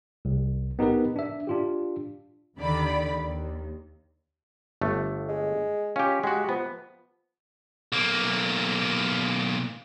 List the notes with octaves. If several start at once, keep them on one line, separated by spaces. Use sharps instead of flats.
C2
B3 D#4 G4 A#4 B4
D4 E5
D4 F4 G4
D#2 D3 D#3 D5 B5
D#2
G1 A3
G#3
C#4 F4 G4
G#3 F#4 G4
F3 B3
B1 A#3